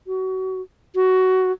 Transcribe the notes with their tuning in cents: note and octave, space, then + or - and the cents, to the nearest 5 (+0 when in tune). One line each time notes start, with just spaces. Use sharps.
F#4 +30
F#4 +15